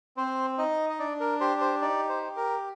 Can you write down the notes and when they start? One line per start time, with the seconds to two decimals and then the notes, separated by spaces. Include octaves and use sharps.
0.17 C4 C5
0.58 D#4 D#5
0.90 D#5
0.99 D4 D5
1.20 A#4
1.40 G4 C5
1.61 C5
1.81 D#4 D5
2.09 C5
2.23 G4
2.36 A#4